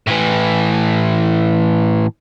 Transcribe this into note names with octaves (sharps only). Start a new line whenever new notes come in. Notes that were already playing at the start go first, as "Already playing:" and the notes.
A2 E3